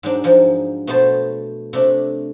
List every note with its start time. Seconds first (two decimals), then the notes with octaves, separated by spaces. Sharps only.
0.03 G#2 F#3 D4
0.24 G#2 F3 F#3
0.87 B2 A3 B3 C5 A5
1.73 C3 A3 D4